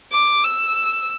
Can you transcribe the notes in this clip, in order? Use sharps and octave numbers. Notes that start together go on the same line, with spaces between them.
D6
E6